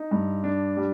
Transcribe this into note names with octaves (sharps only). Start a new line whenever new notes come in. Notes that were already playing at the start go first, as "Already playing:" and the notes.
Already playing: D#4
G2
D4
G3